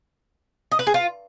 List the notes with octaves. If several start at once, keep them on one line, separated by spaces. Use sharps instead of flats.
D#5
B4
G#4
F4